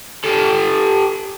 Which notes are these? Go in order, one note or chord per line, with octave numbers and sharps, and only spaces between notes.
G4 A4